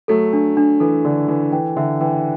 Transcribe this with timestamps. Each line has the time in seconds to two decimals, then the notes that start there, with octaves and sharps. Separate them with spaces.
0.08 F#3 A3 A4
0.33 D4
0.57 D4
0.80 E3 A4
1.05 D3 D5
1.28 E3 A4
1.52 E3 G5
1.77 D3 E5
2.01 E3 G5